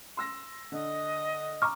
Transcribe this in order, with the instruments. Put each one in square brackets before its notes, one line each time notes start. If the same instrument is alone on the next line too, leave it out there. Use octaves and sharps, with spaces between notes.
[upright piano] C6 E6 A#6
[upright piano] D3 [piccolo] D#5
[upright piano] A#5 D6 [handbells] C#6 F6